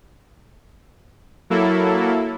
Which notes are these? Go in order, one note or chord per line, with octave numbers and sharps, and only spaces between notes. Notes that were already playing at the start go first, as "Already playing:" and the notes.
F#3 A#3 E4 A4